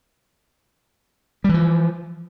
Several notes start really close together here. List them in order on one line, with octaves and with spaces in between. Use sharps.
G3 E3 F3